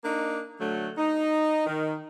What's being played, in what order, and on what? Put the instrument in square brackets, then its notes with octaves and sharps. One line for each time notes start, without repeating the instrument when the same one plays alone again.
[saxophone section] A#3 D4 D#4
D3 F#3 A3
D#4
D#3